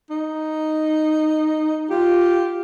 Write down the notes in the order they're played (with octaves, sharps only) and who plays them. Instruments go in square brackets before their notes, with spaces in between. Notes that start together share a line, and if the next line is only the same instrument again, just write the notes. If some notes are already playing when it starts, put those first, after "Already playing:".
[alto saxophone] D#4
[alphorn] F4 [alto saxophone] G4